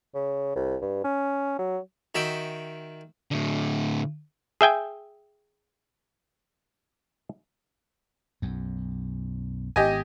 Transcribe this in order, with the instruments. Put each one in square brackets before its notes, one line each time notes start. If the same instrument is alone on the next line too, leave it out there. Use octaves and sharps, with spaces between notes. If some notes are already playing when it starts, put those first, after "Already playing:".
[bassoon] C#3
C2
G2
C#4
F#3
[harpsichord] D#3 F#4 E5 G5
[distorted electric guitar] A2 D3
[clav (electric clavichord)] G#4 E5 G5 G#5
[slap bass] B1 F#2
[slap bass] G#1 B3 [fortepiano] G4 D#5 G#5